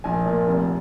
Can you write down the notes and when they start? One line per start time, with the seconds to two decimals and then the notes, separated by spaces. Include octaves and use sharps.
0.04 A#1 G#5
0.26 A#2
0.47 F1